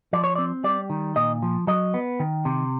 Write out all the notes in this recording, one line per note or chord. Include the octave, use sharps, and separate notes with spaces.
F3 D5
C#5
C4 D5
G3 D5
D#3
A#2 D#5
F3
F#3 D#5
B3
D#3
C3